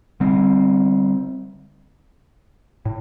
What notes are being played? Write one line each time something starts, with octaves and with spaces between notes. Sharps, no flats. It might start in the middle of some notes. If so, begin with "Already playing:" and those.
D3 G3 C4
A2